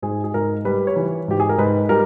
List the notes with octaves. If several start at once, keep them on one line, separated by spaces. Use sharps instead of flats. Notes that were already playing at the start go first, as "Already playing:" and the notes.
G#2 G#4
G#4
G#2 A#4
G3 B4
C#5
E3 B4
G#2 G4
G#4
A#4
G#2 B4
G3 A#4